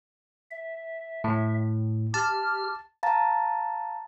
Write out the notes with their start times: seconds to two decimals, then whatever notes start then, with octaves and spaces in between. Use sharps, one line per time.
0.51 E5
1.24 A2
2.14 G4 A5 F6
3.03 F5 A5 A#5 A6